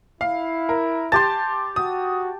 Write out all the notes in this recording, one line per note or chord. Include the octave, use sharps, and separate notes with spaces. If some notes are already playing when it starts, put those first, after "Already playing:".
E4 F5
A#4
G4 A5 C6 A6
F#4 D#6